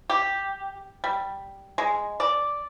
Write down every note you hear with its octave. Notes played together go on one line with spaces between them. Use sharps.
G4
G3
G#3
D5